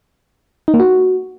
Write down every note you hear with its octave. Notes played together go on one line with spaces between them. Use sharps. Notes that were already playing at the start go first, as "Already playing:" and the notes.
D#4
A#3
F#4